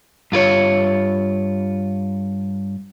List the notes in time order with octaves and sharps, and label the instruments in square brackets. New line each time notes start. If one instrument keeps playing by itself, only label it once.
[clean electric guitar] G2 F4 A#4 C#5